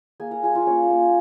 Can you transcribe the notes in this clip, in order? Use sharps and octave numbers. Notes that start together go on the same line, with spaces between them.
A#3 G#4 G#5
A#4 A#5
F4 G#4 G#5
F4 F5
A#3 C#4 C#5
A#3